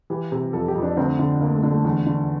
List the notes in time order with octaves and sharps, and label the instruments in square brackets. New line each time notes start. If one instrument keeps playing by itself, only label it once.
[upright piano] E3 G4
C3
F2 A4
G4
F2
D4
D2 C4
D3
D2 A#3
A3
D3
A3
E2
D3